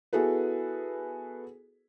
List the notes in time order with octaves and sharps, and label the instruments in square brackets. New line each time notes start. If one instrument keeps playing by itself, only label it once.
[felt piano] B3 E4 F#4 G#4 A4 B4